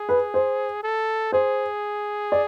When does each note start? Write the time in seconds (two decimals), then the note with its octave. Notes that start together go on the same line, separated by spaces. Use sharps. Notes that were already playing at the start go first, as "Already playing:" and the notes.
Already playing: G#4
0.09 B4
0.34 C5
0.83 A4
1.32 G#4 C5
2.32 D5